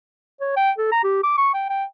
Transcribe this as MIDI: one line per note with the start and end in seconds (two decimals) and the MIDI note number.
0.40 0.56 73
0.57 0.71 79
0.78 0.89 69
0.92 1.02 82
1.04 1.21 67
1.24 1.34 86
1.38 1.51 85
1.54 1.65 79
1.69 1.85 79